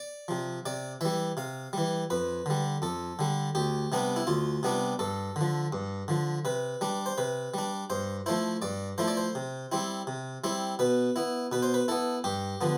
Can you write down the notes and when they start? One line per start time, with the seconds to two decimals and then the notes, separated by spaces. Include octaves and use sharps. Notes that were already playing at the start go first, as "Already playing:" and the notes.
Already playing: D5
0.28 C3 F3
0.66 C3 D5
1.01 E3 G3 E5
1.37 C3 F5
1.73 E3 G3
2.10 F2 B4
2.46 D3 G3
2.82 F2 A4
3.19 D3 G3
3.55 D2 G4
3.92 C3 G3 B3 D4
4.16 E4
4.27 D2 F4
4.63 C3 G3 B3 D4
4.99 G2 A4
5.36 D3 F3
5.73 G2
6.08 D3 F3
6.45 C3 B4
6.81 G3 D4
7.06 C5
7.18 C3 B4
7.54 G3 D4
7.90 G2 C5
8.26 F3 A3 E4 C5
8.62 G2 D5
8.98 F3 A3 E4 C5
9.08 D5
9.17 C5
9.35 C3
9.72 G3 C4 E4
10.07 C3
10.44 G3 C4 E4
10.79 B2 B4
11.16 B3 E4
11.52 B2 B4
11.63 C5
11.74 B4
11.88 B3 E4 A4
12.24 G2 G4
12.61 D3 F3 B3